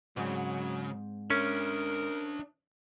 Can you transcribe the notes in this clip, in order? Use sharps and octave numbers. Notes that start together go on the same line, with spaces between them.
G#2 C#3 F#3 C4
C#4 D4 A#4 E5